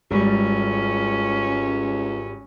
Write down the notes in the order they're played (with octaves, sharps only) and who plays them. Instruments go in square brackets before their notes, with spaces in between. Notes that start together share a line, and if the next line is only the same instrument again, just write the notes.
[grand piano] G#1 G3 [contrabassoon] C#2 [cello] C#4